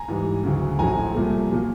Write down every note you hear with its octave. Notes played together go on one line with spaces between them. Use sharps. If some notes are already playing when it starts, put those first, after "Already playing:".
Already playing: G#5 A#5
G#2 E3 G3
D2 C#3 F#3
A#1 A2 F#3 G#5 A#5
C2 A#2 F3 A3
A#2 F#3 A#3